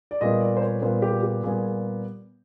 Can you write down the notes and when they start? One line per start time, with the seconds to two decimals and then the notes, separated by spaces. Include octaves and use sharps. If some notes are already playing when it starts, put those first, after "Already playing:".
0.11 D5
0.21 A#2 G3 B3 D#5
0.41 D5
0.57 C5
0.62 C#5
0.82 A#2 G3 B3 C5
1.02 G4
1.23 G4
1.43 A#2 G3 B3 G#4